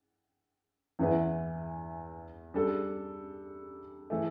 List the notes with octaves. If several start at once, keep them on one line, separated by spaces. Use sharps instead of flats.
E2 E3 B3 E4 B4
G3 D4 A4
E3 A3